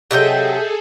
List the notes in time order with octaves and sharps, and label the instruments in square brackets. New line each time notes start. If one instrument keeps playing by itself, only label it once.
[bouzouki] C3 F#3 [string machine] G#4 A4 [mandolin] D#5 E5 G5